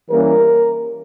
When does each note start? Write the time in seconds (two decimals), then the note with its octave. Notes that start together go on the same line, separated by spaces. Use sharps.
0.11 E3 G3 A#3 C#4 A#4